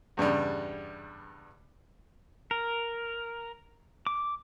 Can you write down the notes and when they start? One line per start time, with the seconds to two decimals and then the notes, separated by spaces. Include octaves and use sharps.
0.17 E2 G2 C#3 G3
2.51 A#4
4.07 D6